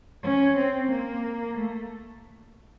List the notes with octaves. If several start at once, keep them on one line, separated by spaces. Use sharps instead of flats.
C#4
C4
A#3
A3